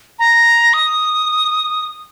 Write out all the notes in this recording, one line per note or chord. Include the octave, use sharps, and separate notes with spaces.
A#5
D#6